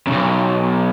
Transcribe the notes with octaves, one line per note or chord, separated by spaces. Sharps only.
B1 F#2